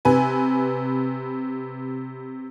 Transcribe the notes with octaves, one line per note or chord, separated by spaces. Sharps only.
C3 B4 G#5